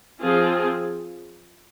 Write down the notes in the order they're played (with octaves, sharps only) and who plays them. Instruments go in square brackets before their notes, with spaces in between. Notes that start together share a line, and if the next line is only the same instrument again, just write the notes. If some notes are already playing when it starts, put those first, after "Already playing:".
[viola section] F3 C4 F4 G#4